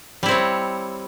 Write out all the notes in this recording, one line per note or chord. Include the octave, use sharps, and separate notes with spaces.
G3 C4 E4 C#5